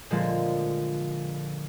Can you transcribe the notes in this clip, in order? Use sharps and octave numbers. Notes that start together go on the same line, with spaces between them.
A#2 D3 F3 G#3 A#3